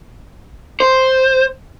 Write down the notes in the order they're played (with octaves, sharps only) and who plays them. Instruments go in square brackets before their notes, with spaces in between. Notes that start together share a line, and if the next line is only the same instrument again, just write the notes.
[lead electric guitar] C5